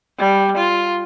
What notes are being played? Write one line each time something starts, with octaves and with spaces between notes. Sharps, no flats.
G3
F4